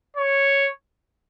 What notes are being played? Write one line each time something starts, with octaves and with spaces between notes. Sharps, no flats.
C#5